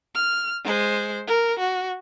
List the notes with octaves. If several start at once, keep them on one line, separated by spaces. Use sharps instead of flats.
F6
G#3 C5
A#4
F#4